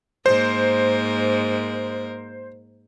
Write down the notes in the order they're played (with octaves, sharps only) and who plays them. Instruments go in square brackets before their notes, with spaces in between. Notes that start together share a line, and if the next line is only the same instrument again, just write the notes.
[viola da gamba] G#2 A#3 A#4 [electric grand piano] C5